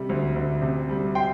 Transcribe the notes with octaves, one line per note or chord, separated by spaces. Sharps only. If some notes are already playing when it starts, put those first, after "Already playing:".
Already playing: C3 G3
D2
D2
C3
G3
G5 C6